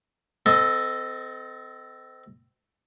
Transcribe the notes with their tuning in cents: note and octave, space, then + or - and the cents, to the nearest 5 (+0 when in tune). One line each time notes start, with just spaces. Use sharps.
C4 -30 A4 +0 D#5 +0